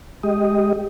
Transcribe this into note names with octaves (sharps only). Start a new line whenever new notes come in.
G#3 G4 D#5